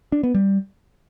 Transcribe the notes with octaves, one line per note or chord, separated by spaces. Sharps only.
D4
B3
G3